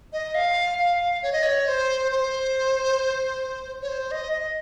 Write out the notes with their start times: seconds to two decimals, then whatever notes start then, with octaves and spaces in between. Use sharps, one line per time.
0.13 D#5
0.35 F5
0.79 F5
1.23 C#5
1.33 D#5
1.43 C#5
1.68 C5
2.12 C5
3.82 C#5
3.88 C5
4.11 D#5
4.33 D#5